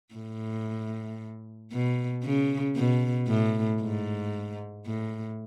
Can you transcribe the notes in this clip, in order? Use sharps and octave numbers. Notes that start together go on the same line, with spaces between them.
A2
B2
C#3
B2
A2
G#2
A2